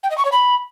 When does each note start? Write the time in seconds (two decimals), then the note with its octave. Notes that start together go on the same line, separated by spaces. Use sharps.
0.03 G5
0.10 D#5
0.18 C#6
0.25 C#5
0.32 B5